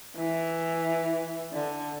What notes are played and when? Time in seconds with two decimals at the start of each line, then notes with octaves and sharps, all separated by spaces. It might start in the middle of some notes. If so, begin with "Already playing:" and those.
0.16 E3
1.53 D3